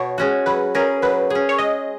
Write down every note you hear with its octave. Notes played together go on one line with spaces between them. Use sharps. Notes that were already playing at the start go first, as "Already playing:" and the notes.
Already playing: B2 C#5
G#3 C#4 F#4
F#3 B4
C#4 G#4 A#4
F#3 B4
C#4 G#4
C#5
G#3 D#5